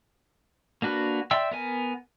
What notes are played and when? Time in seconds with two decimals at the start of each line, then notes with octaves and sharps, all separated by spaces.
0.82 A#3 D4 F#4 B4
1.31 D5 E5 G5 C6 E6
1.51 B3 A#4 G#5